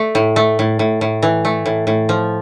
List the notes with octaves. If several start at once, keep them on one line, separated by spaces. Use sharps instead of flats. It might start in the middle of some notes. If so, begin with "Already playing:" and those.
Already playing: A3
A2
A3
A2
A2
A2
E3
A3
A2
A2
F3